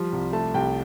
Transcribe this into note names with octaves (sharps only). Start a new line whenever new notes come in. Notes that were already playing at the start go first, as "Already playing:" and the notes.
Already playing: F3 G3
C2
A3 A5
C2 G5